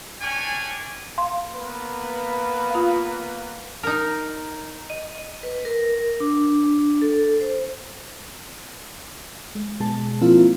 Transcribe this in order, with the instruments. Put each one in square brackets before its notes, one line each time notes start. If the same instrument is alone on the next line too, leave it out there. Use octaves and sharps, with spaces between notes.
[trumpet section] C#4 D4 D5 G5 G#5
[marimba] F5 C6
[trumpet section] A#3 B3 B4
[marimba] F4 F5
[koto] D#4 A#4
[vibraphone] D#5
D#5
B4
A#4
D4
A4
C5
[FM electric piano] G#3
B2 G#3 A5
F3 A#3 C4 E4 F4